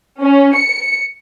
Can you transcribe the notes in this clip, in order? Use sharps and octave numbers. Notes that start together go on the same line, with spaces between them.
C#4
C#7